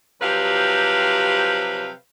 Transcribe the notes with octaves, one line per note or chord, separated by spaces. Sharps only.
C3 F3 F#3 G4 B4 F5